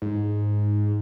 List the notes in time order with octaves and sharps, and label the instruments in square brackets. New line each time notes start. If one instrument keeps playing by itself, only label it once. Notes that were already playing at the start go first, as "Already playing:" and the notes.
[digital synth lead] G#2